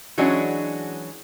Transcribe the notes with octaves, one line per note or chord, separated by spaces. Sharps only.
E3 F#3 G#3 C#4 D4 F#4